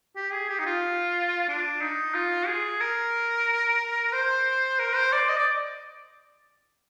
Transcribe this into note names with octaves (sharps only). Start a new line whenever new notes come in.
G4
G#4
G4
D#4
F4
D4
D#4
F4
G#4
A#4
C5
A#4
C5
D5
D#5
D5